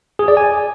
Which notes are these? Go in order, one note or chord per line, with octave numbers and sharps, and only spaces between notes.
G#4
D5
G#5